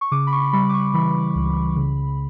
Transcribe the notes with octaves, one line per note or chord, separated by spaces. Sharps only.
C#6
C#3 D6
B5
C#6
G3 B5
D6
C#6
E3 B5
C#2
C#3